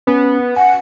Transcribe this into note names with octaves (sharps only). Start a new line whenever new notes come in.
B3 C#4
F#5 G#5